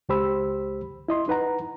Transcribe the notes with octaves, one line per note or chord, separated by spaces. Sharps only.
C#2 G#3 G4 C5 B5 E6
E4 D#5 C6
D#4 B4 F#5 A#5